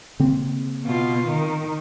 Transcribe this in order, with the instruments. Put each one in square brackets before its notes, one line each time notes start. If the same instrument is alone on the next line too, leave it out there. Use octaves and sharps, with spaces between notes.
[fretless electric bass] C#3 A#3 C4
[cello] B2 F4
D#3